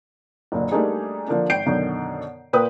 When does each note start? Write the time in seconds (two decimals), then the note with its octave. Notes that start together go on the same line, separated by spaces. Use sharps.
0.52 F#1 A#2 D3
0.72 G3 A3 A#3 D4 D#4 G#4
1.28 D3 F3 A#3 D4
1.50 G#1 G5 G6 C7 D7
1.66 F#2 B2 D3 D#3
2.53 A#2 A#4 B4 G5 D#6